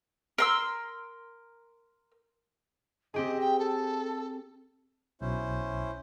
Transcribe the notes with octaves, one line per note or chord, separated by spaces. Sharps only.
A#4 C6 E6
C4 G4 G#4 D#5
G5
A4
B1 B2 C#4 E4 C5